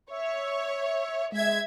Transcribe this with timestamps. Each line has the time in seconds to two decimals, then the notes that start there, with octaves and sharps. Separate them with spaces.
0.10 C#5 E5
1.32 G#3 E5 G#6